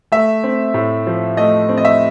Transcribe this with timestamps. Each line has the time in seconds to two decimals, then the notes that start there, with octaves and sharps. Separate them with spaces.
0.12 A3 E5
0.44 C4
0.74 A2
1.07 F3
1.37 A3 D#5
1.69 C4
1.77 D#5
1.85 E5